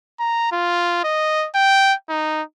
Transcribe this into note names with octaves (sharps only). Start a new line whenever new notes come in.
A#5
F4
D#5
G5
D#4